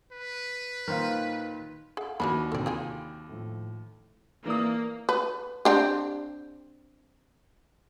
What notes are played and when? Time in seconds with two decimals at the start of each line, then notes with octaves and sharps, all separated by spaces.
0.12 B4
0.88 A#2 D#3 A#4 C5 F5
1.97 G#4 A4 F5 F#5
2.20 D#2 E3 D4 F#4 B5
2.52 D2 C3 A4 D5 G5
2.66 F4 G4 G#4 G5 A5 B5
3.29 A2 F3
4.46 E3 A#3 D5 D#6
5.09 B4
5.65 C4 D4 G4